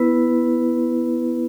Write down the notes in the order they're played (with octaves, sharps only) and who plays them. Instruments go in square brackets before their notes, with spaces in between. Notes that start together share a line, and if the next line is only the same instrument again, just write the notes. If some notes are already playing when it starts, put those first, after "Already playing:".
Already playing: [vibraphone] B3 E4 B4